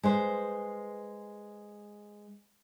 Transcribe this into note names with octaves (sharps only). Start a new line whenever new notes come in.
G#3 B4 C5